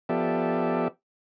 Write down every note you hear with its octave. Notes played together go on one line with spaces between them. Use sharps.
F3 B3 G4 A4 D5 E5